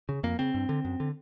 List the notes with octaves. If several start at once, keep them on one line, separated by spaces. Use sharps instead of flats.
C#3
F2 A#3
C#3 C4
G2
D3
F#2
D3